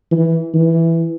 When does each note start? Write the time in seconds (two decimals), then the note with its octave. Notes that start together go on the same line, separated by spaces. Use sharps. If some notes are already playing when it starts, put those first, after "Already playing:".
0.12 E3
0.54 E3